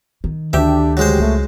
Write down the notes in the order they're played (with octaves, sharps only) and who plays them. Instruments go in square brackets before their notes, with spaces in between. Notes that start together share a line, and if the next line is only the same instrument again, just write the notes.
[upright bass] D#3
[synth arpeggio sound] D2 G4 [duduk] D4 [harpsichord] E5
[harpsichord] F#3 G#3 C5
[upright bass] C#2 [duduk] A3